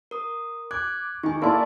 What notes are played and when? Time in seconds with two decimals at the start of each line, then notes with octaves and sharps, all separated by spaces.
0.11 A#4 D#6
0.71 D6 F#6 G#6
1.23 D#3 G#5 C#6
1.42 A#3 E4 D5 A5 C6